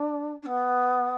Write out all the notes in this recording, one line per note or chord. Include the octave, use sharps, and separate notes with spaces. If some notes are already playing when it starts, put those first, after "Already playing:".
Already playing: D4
D4
B3